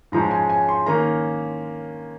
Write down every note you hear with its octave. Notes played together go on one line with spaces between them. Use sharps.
G#2 F3 G#3 C#4 A#5
G#5
G#5
C6
D#3 A#3 C#4 A#5